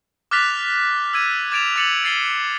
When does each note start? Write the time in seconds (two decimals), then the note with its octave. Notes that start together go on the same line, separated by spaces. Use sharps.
0.31 D6 F6 F#6 A6 B6 F7
1.13 E6 G#6 D#7
1.51 D6 G#6 A6 D7 E7 F7
1.76 D6 A6 C#7 F7 F#7
2.04 G#6 A6 C7 D#7 G7